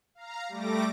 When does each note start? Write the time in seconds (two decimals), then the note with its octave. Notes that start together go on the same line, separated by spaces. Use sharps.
0.15 F5 A#5
0.49 G3 A3 D6 A#6